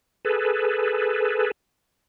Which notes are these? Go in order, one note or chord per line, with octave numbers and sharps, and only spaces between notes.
G#4 A4 B4